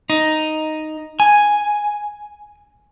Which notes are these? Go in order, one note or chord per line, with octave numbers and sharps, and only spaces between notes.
D#4
G#5